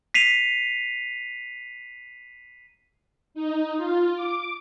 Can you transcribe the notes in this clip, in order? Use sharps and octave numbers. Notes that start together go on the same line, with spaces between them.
B6 C7 D#7 F7
D#4
F4
D6